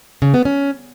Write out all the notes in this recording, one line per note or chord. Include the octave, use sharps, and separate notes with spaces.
C#3
B3
C#4